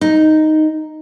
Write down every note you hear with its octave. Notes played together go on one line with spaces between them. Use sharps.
D#4